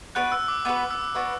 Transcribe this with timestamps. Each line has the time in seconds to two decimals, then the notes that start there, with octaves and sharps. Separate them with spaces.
0.15 B3 D4 F#4 B4 F#6
0.32 E6
0.48 D6
0.65 B3 D4 F#4 B4 D6
0.91 E6
1.15 B3 D4 F#4 B4